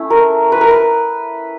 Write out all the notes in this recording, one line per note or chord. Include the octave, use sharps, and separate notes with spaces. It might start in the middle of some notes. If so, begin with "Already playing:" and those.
Already playing: A3 C#4 E4
A#4
B4
A#4
B4